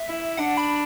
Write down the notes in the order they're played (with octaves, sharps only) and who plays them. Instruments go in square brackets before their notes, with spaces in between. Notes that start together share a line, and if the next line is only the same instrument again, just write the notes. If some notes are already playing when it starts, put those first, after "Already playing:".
Already playing: [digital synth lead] E5
[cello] E4
[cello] D4 [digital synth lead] F#5
[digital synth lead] B5